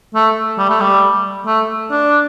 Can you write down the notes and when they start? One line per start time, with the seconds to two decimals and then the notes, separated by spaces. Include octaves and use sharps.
0.15 A3
0.58 G3
0.69 A3
0.80 G3
1.47 A3
1.91 D4